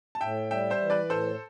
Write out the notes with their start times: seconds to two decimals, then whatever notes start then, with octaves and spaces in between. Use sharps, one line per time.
0.15 A5
0.21 A2 E5 G5
0.51 G3 E5 G5
0.70 C5 E5
0.81 E3
0.90 B4 D5
1.10 A2 A4 C5